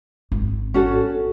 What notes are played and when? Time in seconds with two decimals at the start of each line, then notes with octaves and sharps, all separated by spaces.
0.32 G#1
0.74 C#4 F#4 A4